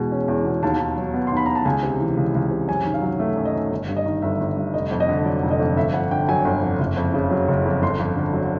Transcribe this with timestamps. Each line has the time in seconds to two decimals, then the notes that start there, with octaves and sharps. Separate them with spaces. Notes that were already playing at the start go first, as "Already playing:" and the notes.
Already playing: E2 B2 G#3
0.12 C#4
0.28 E2
0.45 B2
0.63 D#2 A5
0.80 D#3
0.97 F#3
1.14 B3
1.27 D#2 C6
1.37 B5
1.46 D#3 A#5
1.55 A5
1.65 C#2 G#5
1.83 C3
2.00 E3
2.17 C#2
2.35 C#2
2.51 C3
2.68 F#2 G#5
2.85 D#3
2.94 F5
3.02 F#3
3.19 A3 E5
3.37 F#2
3.45 D#5
3.54 D#3
3.71 G1
3.89 G2
3.97 D#5
4.06 D#3
4.22 G1 E5
4.40 G1
4.57 G2
4.74 F1 D#5
4.91 F2
5.00 D#5
5.09 D3
5.25 F#3 D5
5.43 F1
5.51 D#5
5.60 F2
5.76 G1 E5
5.93 F2 F#5
6.11 D3 G5
6.29 F#3 G#5
6.45 G1
6.62 F2
6.79 F#1
6.97 F2
7.14 C#3
7.31 F#3
7.48 F#1
7.65 F2
7.82 G1 C6
7.99 F2
8.16 D3
8.33 F#3